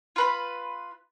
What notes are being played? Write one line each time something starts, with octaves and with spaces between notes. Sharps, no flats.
F4 B4 B5